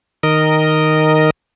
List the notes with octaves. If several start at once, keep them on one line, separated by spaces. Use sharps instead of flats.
D#3 A#4 D#5